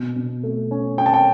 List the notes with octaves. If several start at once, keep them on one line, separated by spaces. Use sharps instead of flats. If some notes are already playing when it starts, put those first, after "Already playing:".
Already playing: B2
B2
A3
C#4
C#4 G5
A5
G5